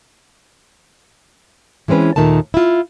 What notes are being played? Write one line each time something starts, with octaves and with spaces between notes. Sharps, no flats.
E3 G#3 C4 C#4 B4
D#2 A#2 D#3 A3 A5
E4 F4